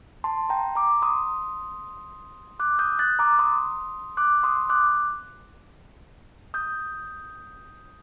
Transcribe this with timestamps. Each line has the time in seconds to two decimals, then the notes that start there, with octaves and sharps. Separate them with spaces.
0.24 A5 C6
0.49 G5 A#5
0.75 A#5 D6
1.02 C6 D#6
2.60 D6 F#6
2.79 D#6 G6
2.99 F#6 A6
3.19 A#5 D6
3.39 C6 D#6
4.17 D6 F#6
4.44 C6 D#6
4.70 D6 F#6
6.54 D#6 G6